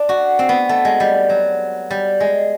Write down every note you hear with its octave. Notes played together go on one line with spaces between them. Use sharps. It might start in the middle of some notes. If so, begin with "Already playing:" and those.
Already playing: D4
F#4
C4
B3
A3
G#3
G3
F#3
G3
G#3